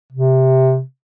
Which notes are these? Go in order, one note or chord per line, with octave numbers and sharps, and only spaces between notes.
C3